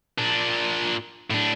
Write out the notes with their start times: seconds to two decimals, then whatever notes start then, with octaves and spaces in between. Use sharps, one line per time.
0.18 A#2 D4
1.30 A2 D4